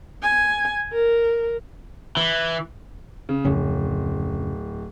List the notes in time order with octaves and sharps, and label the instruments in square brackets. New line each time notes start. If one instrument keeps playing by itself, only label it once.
[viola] G#5
A#4
[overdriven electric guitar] E3
[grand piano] C#3
[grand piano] D1 [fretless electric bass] F2 C#3 C#4